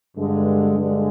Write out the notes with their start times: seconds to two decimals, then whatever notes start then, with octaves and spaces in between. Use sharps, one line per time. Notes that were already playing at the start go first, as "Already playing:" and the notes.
0.17 G2 D3 G#3
0.76 G2 D3 G#3